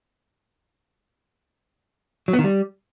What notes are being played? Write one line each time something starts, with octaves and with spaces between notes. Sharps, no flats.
F#3
B3
D#3
G3